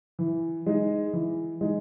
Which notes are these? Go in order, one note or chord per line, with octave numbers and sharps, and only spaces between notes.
E3
G#3 D#4
E3
G#3 D#4